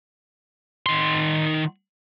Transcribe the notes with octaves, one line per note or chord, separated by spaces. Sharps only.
D#3 C6